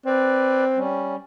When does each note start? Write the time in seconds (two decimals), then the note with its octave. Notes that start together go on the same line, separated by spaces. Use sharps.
0.06 C4 B4 D5
0.76 G3 C#4